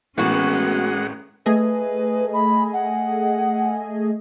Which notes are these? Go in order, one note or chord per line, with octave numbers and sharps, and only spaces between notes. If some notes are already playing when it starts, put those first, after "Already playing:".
G#1 A2 E3 G#3 B3 C#4 F#4 F#5
A3 G#4 B4 D#5
B5
F#5